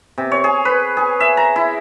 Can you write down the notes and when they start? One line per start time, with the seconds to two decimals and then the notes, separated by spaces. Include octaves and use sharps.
0.18 C3
0.32 C#5
0.44 G#4
0.65 B4
0.97 G#4
1.20 E5
1.37 A#5
1.56 E4